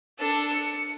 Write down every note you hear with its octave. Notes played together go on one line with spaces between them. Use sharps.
D4 A4
C#7